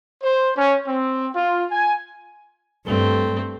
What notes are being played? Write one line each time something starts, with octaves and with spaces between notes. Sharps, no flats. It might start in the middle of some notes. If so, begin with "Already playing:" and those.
C5
C#4
C4
F4
G#5
G2 A3 C4